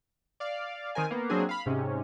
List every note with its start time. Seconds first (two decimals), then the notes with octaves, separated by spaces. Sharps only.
0.40 D5 F5
0.95 D#3 C4 A#4 G#5
1.11 A#3 B3
1.29 F#3 A#3 C4 D4 G#4
1.49 F5 B5
1.66 G#2 C3 C#4